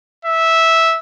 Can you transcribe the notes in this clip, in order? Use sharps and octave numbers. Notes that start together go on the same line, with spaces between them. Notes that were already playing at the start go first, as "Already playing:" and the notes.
E5